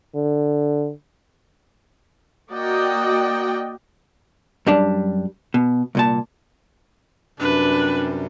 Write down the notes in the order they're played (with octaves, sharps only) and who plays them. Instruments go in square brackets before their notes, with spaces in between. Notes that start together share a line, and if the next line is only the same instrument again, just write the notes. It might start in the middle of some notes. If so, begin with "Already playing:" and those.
[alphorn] D3
[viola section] A#3 F#4 D5 D#5 G5
[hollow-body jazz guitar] F#2 G3 D4
B2
C2 A#2 A5
[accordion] F#2 C3 G3 [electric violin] D4 [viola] B4